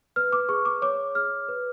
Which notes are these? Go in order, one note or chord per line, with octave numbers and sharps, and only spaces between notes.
B4 F6
D6
G#4 C#6
D6
C#5 D6
G#4 F6
B4